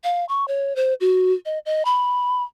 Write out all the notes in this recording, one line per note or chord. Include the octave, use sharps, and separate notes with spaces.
F5
C#6
C#5
C5
F#4
D#5
D#5
B5